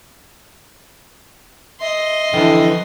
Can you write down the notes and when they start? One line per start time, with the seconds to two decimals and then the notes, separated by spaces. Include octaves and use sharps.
1.80 D#5 E5 C6
2.34 D3 E3 F3 G5